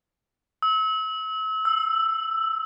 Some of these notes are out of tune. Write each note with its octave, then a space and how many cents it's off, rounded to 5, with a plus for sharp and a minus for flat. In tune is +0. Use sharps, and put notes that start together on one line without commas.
E6 -35
E6 +5